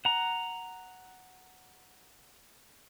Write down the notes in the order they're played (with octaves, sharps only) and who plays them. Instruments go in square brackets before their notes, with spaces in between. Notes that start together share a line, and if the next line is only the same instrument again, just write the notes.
[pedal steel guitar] F#5 A#5